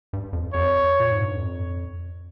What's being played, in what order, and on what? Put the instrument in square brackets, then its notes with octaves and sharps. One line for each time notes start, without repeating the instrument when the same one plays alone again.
[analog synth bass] G2
F2
[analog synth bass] F2 [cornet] C#5
[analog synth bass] A#2
G#2
G2
F2